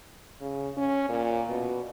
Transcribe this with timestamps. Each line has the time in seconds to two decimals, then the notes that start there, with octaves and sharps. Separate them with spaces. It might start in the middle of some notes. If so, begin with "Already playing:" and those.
0.41 C#3
0.77 C#4
1.09 A#2
1.49 B2